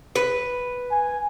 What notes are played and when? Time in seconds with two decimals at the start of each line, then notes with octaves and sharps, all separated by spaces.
0.15 B4
0.92 G#5